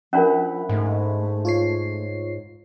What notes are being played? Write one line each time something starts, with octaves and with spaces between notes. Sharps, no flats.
F3 C#4 D4 A#4 E5 F#5 B5
G#2 A3
F4 C#5 C7